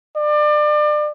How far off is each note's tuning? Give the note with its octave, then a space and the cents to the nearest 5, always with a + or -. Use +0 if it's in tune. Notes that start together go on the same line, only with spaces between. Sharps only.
D5 +30